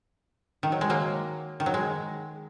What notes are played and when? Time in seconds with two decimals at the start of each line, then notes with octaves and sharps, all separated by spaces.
0.63 D#3
0.72 F#3
0.81 G#3
0.90 F#3 A#3
1.60 D#3
1.66 F#3
1.74 G#3